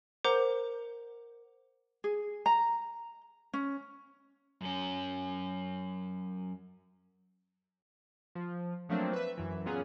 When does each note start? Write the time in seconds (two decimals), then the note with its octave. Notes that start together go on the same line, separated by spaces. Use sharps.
0.24 A#4 C5 F#5 A#5 D6 G6
2.04 G#4
2.46 A#5
3.53 C#4
4.61 F#2 C#4
8.35 F3
8.89 F3 F#3 A3 A#3 C4 D4
9.13 B4 E5
9.37 F#2 E3
9.66 A#2 F#3 B3 C#4 F4 G#4